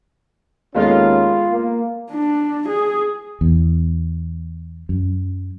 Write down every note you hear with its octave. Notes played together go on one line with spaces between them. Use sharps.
D#2 G#3 A#3 B3 C#4 F4 A4
A#3
D4
G#4
E2
F#2